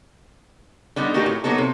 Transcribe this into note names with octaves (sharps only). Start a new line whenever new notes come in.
D3 G3 B3 D#4
A3 A#3 D#4 F#4 G4 A#4
A2
F#3 A#3 B3 D#4 A4
C3